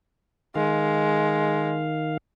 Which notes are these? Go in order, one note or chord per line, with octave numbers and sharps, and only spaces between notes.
D#3 G#3 F5